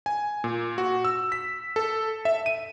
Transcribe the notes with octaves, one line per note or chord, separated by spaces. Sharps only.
G#5
A#2
F#4
E6
B6
A4
E5
D#7